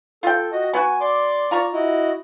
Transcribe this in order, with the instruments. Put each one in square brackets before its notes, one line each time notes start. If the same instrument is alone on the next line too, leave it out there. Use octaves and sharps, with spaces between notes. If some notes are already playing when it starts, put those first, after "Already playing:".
[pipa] F4 G5 [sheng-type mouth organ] A4
[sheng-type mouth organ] F#4 D#5
[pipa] B3 F#4 [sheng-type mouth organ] G#5
[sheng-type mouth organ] D5 C6 D6
[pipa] F4 A#5 C#6 [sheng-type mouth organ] D5
[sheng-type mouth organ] E4 F#4 D#5